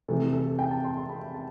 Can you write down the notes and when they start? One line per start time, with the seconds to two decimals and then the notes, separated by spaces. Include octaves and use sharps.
0.08 C3 E3 A3 A4
0.21 A4
0.33 A4
0.47 A4
0.59 G5
0.71 A5
0.84 C6
0.97 C6
1.09 B5
1.34 A5